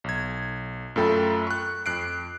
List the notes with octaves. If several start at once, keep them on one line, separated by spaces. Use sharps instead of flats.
B1 G#6
F#2 A3 F4 A4 G5 B5
C#6 F#6
F2 F#6 C7 D7